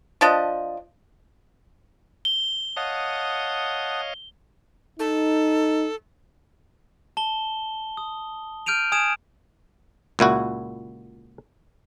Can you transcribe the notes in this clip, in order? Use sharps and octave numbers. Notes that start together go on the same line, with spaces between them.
F3 D4 D#5
G7
C#5 D#5 F5 F#5 A5 D#6
D#4 A4
A5 G7
D#6
F6 G6 D7 D#7 F7
G#5 D#6 G#6 D7 E7 F7
C#2 A#2 E4 F#4